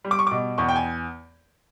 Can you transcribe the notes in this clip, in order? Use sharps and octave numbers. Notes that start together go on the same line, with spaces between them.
G3
D6
C#6
B2 D6
E2 C#6
G5
G#5